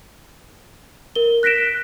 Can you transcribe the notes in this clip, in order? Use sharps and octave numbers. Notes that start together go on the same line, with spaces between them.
A#4 G7
F#6 A#6 B6 D7 E7